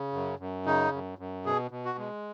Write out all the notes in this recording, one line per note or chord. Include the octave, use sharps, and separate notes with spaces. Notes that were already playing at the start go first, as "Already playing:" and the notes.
Already playing: C#3
F#2
F#2
C#3 D#4
F#2
F#2
B2 G#4
B2
F#4
G#3